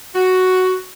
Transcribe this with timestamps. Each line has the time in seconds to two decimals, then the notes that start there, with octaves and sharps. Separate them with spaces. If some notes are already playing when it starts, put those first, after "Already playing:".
0.15 F#4